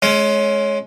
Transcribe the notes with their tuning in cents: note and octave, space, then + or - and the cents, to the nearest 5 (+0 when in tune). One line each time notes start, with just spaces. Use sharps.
G#3 +25 C#4 +0